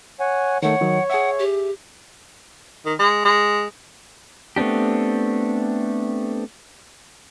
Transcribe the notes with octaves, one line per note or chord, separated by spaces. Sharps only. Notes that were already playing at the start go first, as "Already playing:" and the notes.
C#5 F#5 G#5
D#3 A3 C#5 F#5
D#3 F#3 D#4
G#4 E5 F#5
G4
D#3
G#3
G#3
A3 B3 C4 D4 G4